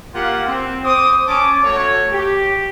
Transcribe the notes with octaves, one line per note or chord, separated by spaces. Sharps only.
A#3 F4 G4 F#5
C4
C5 D6 D#6
C#4 A5 D6
A3 F#4 C#5
G4